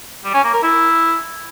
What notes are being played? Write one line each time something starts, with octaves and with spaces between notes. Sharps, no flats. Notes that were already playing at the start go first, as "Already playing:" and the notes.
G3
C#4
A#3
A#4
E4